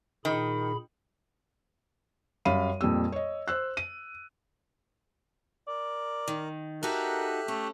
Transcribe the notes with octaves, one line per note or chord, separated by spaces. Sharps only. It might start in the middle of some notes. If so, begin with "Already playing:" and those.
A#2 D#3 G#4 B5
F#2 G3 F5 B5 D#7
F2 A#2 G3 E6
C#5 D#5
C5 E6 F#6
D#7
A#4 D5
D#3
D#4 F#4 G4 A4 A#4 E5 F#6
A3 C#4